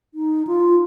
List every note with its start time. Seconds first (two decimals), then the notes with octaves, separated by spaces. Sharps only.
0.14 D#4
0.47 F4